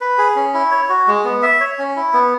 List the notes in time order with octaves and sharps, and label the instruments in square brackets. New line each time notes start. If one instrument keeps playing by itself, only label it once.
[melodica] B4
G#4
C#4
E4
C#5
F#4
G#3
B3
E5
C#5
C#4
E4
B3